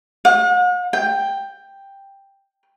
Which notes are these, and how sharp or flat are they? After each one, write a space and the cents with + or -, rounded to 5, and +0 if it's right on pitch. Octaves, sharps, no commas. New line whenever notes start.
F#5 -45
G5 +5